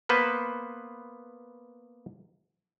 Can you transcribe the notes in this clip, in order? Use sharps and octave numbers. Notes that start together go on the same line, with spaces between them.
A#3 B3 B4 C5